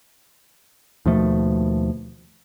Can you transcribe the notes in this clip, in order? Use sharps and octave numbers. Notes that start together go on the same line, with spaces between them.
D#2 B2 F3 A3